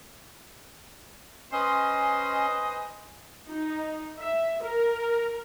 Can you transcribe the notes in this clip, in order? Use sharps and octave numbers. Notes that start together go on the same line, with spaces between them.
C#4 B4 C5 D#5 G#5 C6
D#4
E5
A#4